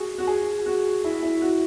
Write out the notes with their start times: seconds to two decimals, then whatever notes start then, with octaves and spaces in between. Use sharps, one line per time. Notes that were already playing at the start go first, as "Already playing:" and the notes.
Already playing: F#4 G#4
0.18 F#4
0.27 G#4
0.66 F#4
1.04 E4
1.23 E4
1.42 F#4